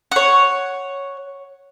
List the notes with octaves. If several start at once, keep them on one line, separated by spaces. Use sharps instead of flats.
C#5 F#5